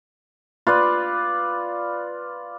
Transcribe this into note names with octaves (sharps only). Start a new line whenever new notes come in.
F4 B4 D5